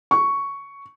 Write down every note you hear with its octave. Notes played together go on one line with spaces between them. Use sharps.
C#6